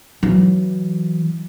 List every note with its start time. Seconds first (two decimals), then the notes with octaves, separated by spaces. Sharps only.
0.23 E3 F#3